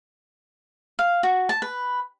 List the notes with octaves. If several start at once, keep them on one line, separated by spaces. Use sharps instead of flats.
F5
F#4
A5
B4